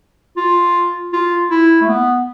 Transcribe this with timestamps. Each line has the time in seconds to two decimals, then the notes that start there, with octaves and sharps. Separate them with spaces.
0.37 F4
1.13 F4
1.51 E4
1.81 A3
1.89 B3